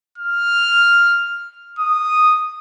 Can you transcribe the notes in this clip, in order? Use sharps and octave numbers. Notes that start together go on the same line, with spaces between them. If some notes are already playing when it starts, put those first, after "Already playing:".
F6
D#6